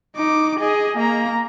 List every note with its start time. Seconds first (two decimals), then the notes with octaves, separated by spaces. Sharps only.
0.16 D#4 D6
0.59 G#4 D#5
0.97 A#3 A#5